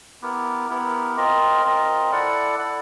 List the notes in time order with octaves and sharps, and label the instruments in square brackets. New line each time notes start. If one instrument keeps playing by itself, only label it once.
[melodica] B3 E4 G4 A#4
B3 E4 G4 A#4
C4 F4 A#4 D#5
C4 F4 A#4 D#5
E4 A4 D5 F#5
E4 A4 D5 F#5